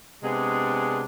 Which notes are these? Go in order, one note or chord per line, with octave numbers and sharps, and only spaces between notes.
C3 G#3 B3 D4 G#4